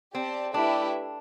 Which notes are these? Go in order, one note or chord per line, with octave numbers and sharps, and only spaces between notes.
C4 G4 D5 A5
A3 D4 E4 G4 B4 E5